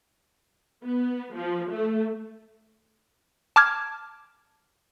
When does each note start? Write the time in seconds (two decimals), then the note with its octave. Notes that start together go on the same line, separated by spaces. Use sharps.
0.84 B3
1.36 F3
1.72 A3
3.56 A5 D6 F6 G#6